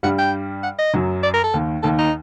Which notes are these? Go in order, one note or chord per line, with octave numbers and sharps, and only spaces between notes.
G2 G3 F#5
G5
F#5
D#5
F#2 F#3
D5
A#4
A4
D#2 D#3
D#2 D#3 A4
D#4